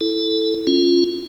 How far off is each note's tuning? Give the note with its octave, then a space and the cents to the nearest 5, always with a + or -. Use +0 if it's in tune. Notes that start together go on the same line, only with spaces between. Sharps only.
E4 +0 A4 +0
C#4 -5 F4 +0